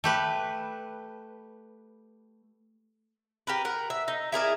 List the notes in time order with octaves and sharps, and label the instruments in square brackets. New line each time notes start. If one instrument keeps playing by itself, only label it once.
[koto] A3 G4 B4
[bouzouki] G4 A#4 B4
A#4 F#5
E5
D#4
E4 G#4 A#4 D5